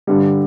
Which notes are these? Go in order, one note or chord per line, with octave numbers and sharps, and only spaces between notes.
G2 D3 G3